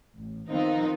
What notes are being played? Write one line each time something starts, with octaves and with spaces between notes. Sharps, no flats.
A1
D#3 F3 B3 C4 D#4 F4